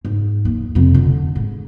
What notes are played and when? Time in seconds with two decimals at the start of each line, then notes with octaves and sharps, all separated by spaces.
0.05 G#2
0.45 D#2 F3
0.75 F2 C3
0.94 D3
1.35 G#2